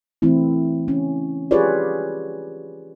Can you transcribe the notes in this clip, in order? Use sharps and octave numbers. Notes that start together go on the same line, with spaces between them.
E3 A3 C4 E4
C#4
F4 G4 G#4 B4 C#5 D5